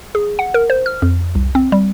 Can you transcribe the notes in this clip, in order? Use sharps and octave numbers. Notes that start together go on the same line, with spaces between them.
G#4
F#5
A#4
C5
F6
F2
C2
C4
G3